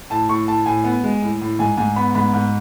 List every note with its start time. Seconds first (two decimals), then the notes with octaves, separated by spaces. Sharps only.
0.10 A2 A5
0.29 A2 C#6
0.48 A2 A5
0.66 A2 G#5
0.84 B3
1.04 G#3
1.22 A2
1.41 A2
1.59 G#2 G#5
1.77 G#2 G#5
1.96 B3 B5
2.15 G#2 B5
2.34 G#2